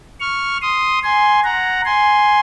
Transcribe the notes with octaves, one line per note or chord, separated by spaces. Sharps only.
C#6 F6
C6 D#6
G#5 C6
F#5 A#5
G#5 C6